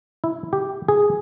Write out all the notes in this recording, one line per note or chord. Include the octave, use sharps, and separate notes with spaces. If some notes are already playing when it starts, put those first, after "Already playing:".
E4
G4
G#4